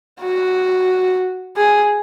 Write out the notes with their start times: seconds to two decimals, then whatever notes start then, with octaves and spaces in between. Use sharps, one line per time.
0.21 F#4
1.57 G#4